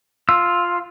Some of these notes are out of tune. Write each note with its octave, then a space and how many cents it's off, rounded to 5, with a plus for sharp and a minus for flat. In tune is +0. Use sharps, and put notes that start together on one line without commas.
F4 +0 E6 +0